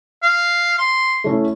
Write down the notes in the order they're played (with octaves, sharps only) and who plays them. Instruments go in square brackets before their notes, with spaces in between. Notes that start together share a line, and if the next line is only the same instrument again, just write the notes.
[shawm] F5
C6
[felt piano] A3 C#4 E4